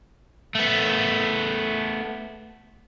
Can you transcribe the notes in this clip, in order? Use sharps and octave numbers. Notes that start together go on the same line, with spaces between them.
A3 B3